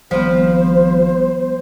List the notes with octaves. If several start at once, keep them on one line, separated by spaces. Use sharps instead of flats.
G#1 F3 G3 B3 C5